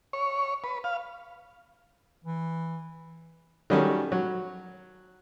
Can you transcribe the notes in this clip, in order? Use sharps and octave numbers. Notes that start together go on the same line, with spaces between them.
C#5
B4
F5
E3
D#3 F#3 G3 A3 C#4
F#3